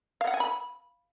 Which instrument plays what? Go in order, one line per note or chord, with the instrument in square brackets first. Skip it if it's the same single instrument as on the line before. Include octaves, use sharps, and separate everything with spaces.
[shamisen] F5
F#5
G#5
B5